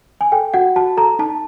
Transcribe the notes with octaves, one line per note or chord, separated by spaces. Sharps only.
G#5
A4 G5
F#4 F#5
F#4 A5
A4 A#5
D#4 A5